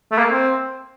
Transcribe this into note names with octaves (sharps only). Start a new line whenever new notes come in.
A3
A#3
C4